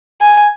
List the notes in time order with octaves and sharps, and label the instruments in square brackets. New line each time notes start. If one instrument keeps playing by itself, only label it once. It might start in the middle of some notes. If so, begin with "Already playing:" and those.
[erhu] G#5